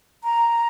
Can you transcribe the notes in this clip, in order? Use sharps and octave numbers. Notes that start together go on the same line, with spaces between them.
A#5